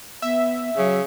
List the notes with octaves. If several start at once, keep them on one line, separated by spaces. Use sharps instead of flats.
B3 E5
C#3 F#3